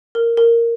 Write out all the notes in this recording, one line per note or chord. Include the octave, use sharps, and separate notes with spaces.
A#4
A#4